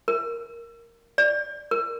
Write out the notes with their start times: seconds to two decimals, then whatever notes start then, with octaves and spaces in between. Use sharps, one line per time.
0.08 A#4
1.18 D5
1.71 A#4